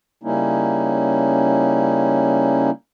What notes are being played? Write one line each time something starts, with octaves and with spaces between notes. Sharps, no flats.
C#3 G3 A#3 C#4 D#4 E4